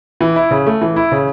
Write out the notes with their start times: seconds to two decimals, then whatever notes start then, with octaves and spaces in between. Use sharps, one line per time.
0.21 E3
0.36 E4
0.51 C#3
0.66 A3
0.81 E3
0.96 E4
1.12 C#3